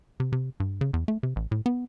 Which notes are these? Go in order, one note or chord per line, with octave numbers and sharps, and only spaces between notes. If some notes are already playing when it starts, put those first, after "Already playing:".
C3
C3
G2
C#3
E2
A3
C3
A1
A2
B3